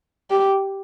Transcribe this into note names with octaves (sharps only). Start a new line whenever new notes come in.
G4